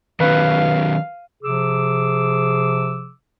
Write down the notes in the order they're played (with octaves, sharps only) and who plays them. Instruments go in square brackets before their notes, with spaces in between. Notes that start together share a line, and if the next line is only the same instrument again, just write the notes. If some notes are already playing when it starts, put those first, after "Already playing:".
[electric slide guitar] D#3 F#3 C#4 [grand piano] B4 [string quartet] F5
[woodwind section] C3 F3 G#4 D6 E6